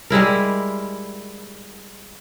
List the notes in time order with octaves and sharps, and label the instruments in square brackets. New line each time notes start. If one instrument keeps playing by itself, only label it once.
[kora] G3 G#3 E4 A#4